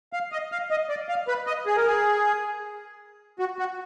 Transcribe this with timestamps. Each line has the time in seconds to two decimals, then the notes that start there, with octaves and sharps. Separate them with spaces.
0.13 F5
0.32 D#5
0.52 F5
0.70 D#5
0.89 D5
1.09 F5
1.28 B4
1.47 D#5
1.66 G#4
1.77 A#4
1.87 G#4
3.39 F#4
3.59 F#4